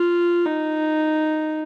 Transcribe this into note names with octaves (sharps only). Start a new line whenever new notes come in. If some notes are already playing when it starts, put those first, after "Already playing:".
Already playing: F4
D#4